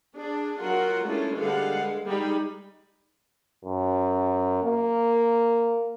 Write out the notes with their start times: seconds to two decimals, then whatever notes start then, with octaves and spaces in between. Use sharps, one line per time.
0.15 D4 G#4
0.61 F#3 F4 F#4 A#4 F#5
1.05 G#3 A3 C#4 D4 E4 F4
1.37 D3 G3 G#3 B4 F5 F#5
1.77 G#3
2.07 G3 G#3 D#4 G#4 B5
3.65 F#2
4.64 A#3